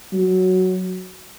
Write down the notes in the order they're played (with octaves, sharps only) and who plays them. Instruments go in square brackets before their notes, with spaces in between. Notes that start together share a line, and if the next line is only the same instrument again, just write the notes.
[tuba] F#3